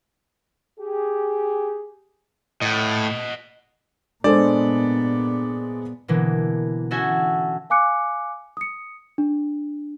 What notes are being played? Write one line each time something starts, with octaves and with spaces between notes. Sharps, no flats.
G4 G#4
A2 D#5 F#5
A#2 G#3 B3 D4 A4 C5 D5
B2 D3 E3 A#3
C#4 E4 F#4 A4 E5 G#5
F5 G#5 D6 F#6 C#7
D#6 C#7
D4